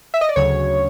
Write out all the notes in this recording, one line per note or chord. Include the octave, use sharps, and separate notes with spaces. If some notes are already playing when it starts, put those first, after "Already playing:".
E5
D#5
D5
D2 C#3 F#3 C#5